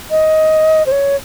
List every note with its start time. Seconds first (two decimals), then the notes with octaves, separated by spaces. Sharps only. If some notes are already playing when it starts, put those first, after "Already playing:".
0.11 D#5
0.86 C5
0.92 C#5